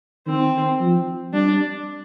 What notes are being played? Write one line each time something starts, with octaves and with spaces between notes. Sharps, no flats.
D#3 C4
F3
G3 D4